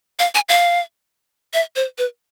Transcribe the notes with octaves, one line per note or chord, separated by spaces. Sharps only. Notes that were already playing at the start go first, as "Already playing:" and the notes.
F5
G#5
F5
E5
C5
B4